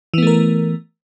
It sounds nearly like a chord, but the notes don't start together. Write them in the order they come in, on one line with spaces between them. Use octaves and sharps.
E3 B3 A3 A#4